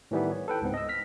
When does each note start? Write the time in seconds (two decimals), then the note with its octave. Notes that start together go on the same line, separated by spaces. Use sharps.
0.11 A2 D#3 E3 G3 A3 B3
0.31 C#5
0.48 A4 B4 G5
0.61 C#2 G#2 B3 C4
0.74 D#5 E6
0.89 F6 B6